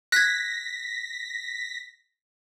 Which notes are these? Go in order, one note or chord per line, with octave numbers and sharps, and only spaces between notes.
F#6 G#6 A#6 B6